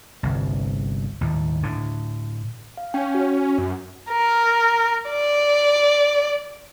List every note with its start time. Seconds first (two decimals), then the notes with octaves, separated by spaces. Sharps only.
0.23 G1 C2
1.21 D#2 A2
1.63 A2 D3
2.77 F5
2.94 C#4 G5
3.15 F#4
3.58 F#2
4.10 A#4
5.10 D5